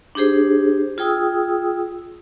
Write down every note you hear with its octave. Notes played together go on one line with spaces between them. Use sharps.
D4 D#4 G4 G#4 C5
F4 G#4 G5 D#6 E6